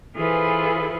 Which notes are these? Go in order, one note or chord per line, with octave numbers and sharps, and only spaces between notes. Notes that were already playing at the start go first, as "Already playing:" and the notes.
E3 F4 G#4 A4 B4 C5